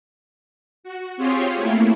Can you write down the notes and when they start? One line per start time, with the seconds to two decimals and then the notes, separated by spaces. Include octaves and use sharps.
0.84 F#4
1.17 C4 F4 G4 G#4 C5 C#5
1.56 A3 A#3 E4